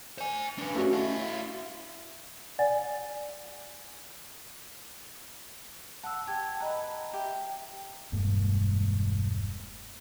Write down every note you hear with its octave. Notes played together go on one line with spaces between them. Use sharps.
C5 G#5
D4 B4
A3 C#4 F#4
E4 F5
D5 F#5 G#5 A6
F#5 A5 E6
G4 A5 G#6
B4 D#5 F#5 A5 A#5
G4 E5
E1 G2 G#3 A#3